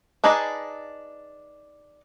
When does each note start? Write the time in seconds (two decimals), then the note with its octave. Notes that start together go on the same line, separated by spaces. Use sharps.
0.24 D4 D#4 G#4 B4 D#5